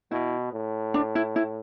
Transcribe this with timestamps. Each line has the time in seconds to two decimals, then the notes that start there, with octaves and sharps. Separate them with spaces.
0.11 B2 E4
0.53 A2
0.94 D4
1.15 E4
1.36 E4